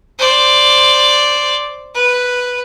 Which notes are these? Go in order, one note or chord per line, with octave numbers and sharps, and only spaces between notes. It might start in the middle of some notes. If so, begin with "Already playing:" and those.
C5 D5
B4